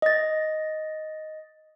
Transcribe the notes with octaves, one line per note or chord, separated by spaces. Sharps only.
D#5 A6